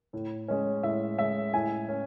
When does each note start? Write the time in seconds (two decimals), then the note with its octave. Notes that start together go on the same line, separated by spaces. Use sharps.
0.13 A2
0.48 G#3 C#4
0.83 A2 E5
1.18 G#3 C#4 E5
1.54 A2 G#5
1.89 C#4